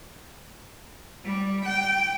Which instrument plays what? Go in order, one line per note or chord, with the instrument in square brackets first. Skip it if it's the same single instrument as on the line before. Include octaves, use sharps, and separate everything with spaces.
[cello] G3
G5